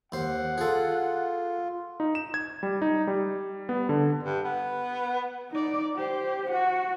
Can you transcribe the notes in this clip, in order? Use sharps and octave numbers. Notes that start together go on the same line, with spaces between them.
D#2 C5 F#5
F4 G#4 A4
D#4
E7
G#6
G3
D#4
G3
B3
D3
G2
B3
D#4 D5
G4 C5
F#4 F#5